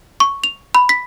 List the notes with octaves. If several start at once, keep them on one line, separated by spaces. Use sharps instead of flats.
C#6
F7
B5
B6